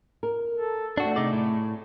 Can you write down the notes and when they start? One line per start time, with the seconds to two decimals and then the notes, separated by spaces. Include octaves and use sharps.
0.23 A#4
0.55 A4
0.98 A3 C4 D4 F#4 A5
1.16 C3 D#4 G#4 D5
1.33 A2